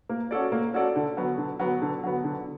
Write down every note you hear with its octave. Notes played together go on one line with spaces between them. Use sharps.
A#3
C#4 F#4 A4 D5
A#3
C#4 F#4 A4 D5
D3
F#3 B3
D3
F#3 B3
D3
F#3 B3
D3